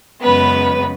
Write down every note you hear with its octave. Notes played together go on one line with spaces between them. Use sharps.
F#2 C#3 G#3 B3 B4